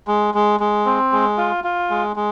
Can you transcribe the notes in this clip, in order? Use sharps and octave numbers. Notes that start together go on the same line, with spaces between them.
G#3
G#3
G#3
C4
G#3
F4
F4
G#3
G#3